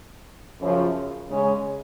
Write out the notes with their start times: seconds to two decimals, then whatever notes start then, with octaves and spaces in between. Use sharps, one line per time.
0.60 F#2 C#3 F3
1.27 C#3 G#3 C#4